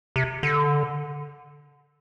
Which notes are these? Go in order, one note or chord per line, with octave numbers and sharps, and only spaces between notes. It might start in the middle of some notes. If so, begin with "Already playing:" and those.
C3
D3